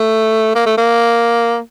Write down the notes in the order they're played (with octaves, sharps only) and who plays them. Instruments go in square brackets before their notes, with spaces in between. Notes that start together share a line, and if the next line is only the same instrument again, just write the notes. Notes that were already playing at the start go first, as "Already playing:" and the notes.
Already playing: [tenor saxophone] A3
A#3
A3
A#3